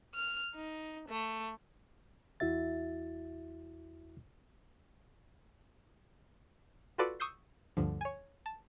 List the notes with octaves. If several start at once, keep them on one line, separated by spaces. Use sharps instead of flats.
F6
D#4
A3
E2 E4 F#4 E5 A6
F4 F#4 A4 B4 D5
C#6 D#6 E6 G6 C7
D2 G2 D3 F3
C#5 G#5
A5